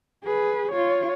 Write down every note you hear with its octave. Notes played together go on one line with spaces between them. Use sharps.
G#4 B4
F4 C#5